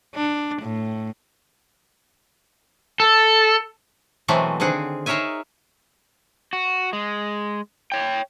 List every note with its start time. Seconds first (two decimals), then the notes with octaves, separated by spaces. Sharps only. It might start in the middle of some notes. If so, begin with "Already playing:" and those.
0.15 D4
0.63 A2
3.00 A4
4.28 B2 E3 F#3 G#3 A3 C4
4.60 D3 D#3 C4 G#4 F#5
5.06 D#4 G#4 A#4 C#5 E5 G#5
6.53 F#4
6.93 G#3
7.92 C#5 G5